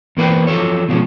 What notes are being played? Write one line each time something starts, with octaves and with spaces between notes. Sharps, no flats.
E2 A#3 B4 C5 G5
F3 F#3 A4 C#5
B2 E3 F3 G3 G#3 C#4